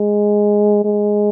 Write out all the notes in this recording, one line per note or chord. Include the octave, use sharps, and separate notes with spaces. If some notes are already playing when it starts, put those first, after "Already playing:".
Already playing: G#3
G#3